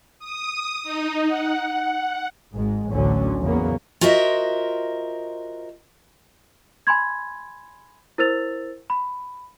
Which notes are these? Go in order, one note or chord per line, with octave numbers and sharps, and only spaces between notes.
D#6
D#4
F#5
G#1 G#2 G#3
A1 D2 A2 D3 F#3 C#4
E2 C#3 F#3 A#3 B3
F4 F#4 A#4 C5 D#5 E5
G#5 B5 C6 G#6
E4 A#4 C5 E6 A6 F7
B5